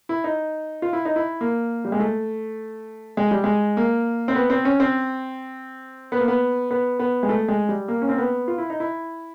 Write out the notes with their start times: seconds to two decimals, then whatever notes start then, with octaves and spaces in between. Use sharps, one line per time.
0.09 E4
0.24 D#4
0.82 F4
0.93 E4
1.05 D#4
1.16 E4
1.41 A#3
1.85 G3
1.92 G#3
2.00 A3
3.17 G#3
3.31 G3
3.44 G#3
3.77 A#3
4.28 C4
4.35 B3
4.50 C4
4.65 C#4
4.80 C4
6.12 B3
6.19 A#3
6.28 B3
6.71 B3
6.99 B3
7.23 G#3
7.29 A3
7.48 G#3
7.69 G3
7.88 A#3
8.02 C#4
8.09 C4
8.18 B3
8.48 F4
8.58 E4
8.70 D#4
8.80 E4